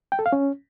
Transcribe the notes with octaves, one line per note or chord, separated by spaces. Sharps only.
G5
A4
F5
C#4